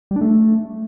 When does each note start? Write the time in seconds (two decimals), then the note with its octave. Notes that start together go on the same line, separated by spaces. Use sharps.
0.11 G3
0.16 D4
0.21 A3